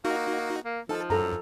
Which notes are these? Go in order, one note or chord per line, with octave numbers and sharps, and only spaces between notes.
A#3 D#4 F#4
A#3
F3 D#4 A4 A5
F#2 A4 A#5